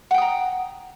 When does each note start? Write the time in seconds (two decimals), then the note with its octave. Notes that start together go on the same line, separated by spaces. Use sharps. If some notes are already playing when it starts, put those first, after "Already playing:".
0.11 F#5
0.14 G5
0.18 D#6
0.22 A#5